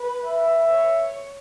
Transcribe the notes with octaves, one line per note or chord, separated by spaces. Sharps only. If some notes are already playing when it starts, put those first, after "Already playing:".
Already playing: B4
E5
C#5